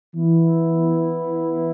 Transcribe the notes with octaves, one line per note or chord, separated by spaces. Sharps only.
E3 B3 E4